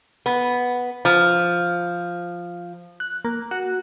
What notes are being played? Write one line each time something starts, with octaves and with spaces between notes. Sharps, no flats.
B3
F3
F#6
A#3
F#4